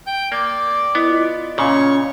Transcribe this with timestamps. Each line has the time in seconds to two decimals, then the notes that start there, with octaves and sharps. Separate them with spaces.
0.07 G5 G6
0.32 A#3 D5
0.95 B3 E4 D#5
1.10 F4 D#5
1.58 A#2 C#3 C#4 C#5 C#6